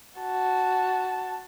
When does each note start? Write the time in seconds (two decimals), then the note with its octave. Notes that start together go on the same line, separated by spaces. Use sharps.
0.20 F#4 A5